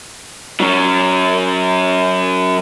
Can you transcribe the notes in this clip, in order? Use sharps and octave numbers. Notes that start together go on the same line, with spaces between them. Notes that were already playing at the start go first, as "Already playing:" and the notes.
F#3 C#4